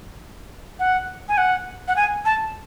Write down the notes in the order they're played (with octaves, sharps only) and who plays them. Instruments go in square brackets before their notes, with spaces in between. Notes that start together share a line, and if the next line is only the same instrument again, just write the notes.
[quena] F#5
G#5
F#5
F#5
G#5
A5